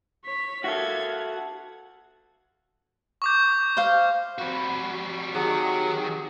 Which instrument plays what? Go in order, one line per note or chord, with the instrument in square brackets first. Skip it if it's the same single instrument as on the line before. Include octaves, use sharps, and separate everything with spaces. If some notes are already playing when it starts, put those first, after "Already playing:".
[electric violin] C#5 B6
[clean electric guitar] F#4 A4 [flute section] A#4 E5 [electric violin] F5 G#6
[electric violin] F#5
[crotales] C#6 D6 G6
[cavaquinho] C5 F5
[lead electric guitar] G3 F#4 [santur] C4 B5 C#6
[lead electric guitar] D#3 [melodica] F#3 F#5 [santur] G4 A5 [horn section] G#4